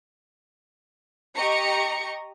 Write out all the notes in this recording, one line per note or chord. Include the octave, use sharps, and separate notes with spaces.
G4 D#5 A#5 C#6 C#7